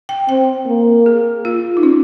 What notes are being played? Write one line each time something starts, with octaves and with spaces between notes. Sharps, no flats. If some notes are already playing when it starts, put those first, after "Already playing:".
G5
C4 G5
A#3
G#4
F4
D#4
C#4